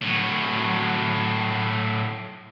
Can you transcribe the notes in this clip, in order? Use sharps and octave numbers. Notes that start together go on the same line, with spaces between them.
A2 F#3